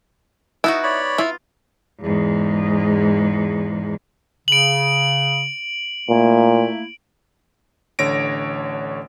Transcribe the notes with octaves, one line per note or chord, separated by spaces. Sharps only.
B3 D#4 E4 F#4
C#5 D5 B5
E4 F4
E2 G#2
C#3 D7 F#7
A#2 A3 A#3 E4
A1 D3 C#5 A#6 D7